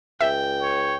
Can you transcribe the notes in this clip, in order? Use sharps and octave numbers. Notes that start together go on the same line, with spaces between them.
C#2 E5 G5
C#5